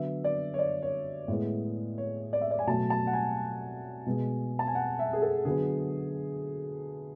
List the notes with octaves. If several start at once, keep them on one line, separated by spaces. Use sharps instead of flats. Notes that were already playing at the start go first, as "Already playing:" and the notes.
Already playing: D3 F#3 B3 E5
D5
C#5
D5
C#5
A2 G#3 B3
C#5
D5
E5
D5
G#5
B2 F#3 A3 A5
A5
F#5
G#5
B2 G#3 B3
A5
G#5
F#5
E5
G#4
A4
D3 F#3 B3 G#4